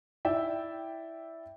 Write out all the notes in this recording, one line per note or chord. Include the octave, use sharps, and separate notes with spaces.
E4 D5 E5 G5